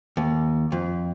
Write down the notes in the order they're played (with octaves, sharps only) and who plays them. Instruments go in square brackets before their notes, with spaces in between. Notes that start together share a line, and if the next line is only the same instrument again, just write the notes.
[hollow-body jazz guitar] D#2
F2